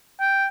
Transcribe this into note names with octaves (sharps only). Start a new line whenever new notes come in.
G5